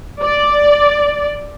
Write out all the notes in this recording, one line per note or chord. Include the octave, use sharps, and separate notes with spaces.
D5